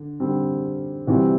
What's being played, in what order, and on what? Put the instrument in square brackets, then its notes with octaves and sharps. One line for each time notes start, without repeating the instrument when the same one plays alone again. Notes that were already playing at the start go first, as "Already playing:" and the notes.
Already playing: [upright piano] D3
D3 G3 C4
C3 E3 G3 C4 F#4